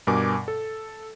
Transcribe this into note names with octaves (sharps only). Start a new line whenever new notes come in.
G2 B2 A#4 G#5 D6
A4